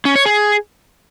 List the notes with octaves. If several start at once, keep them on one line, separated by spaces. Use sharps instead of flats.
C#4
C#5
G#4